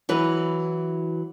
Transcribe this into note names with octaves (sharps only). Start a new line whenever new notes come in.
E3 F#3 B4